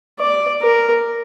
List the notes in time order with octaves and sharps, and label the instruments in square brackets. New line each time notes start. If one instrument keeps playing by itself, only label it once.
[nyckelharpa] D5
A#4